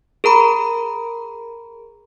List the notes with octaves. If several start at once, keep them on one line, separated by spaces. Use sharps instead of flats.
G#4 A#4 A#5 B5